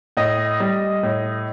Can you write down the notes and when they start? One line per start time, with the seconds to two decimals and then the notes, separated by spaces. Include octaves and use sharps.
0.17 A2 D#5
0.60 G3
1.03 A2